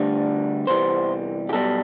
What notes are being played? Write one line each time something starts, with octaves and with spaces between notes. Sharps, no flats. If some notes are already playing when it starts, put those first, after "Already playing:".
Already playing: D2 D3 G3 C5
E2 C3 E3 G3 C5
G4
B1 B2 G3 A4